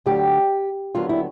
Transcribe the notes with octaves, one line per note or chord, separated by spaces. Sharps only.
D2 D3 F#3 G4
D#2 D3 F#3 B3 F4
E4